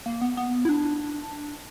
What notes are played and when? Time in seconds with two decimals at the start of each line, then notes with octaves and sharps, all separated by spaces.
0.06 A#3
0.21 B3
0.37 B3
0.65 E4
0.69 D4